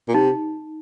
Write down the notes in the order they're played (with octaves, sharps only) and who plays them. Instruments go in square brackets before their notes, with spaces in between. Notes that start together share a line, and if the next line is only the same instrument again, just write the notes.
[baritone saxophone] A#2
[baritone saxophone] C3 [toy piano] D#4